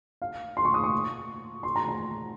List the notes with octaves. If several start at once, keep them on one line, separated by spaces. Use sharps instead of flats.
F5
C6
C#6
D#6
C#6
C6
A#5
A#5